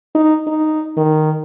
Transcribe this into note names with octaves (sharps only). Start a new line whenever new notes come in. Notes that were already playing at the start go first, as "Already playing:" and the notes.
D#4
D#4
D#3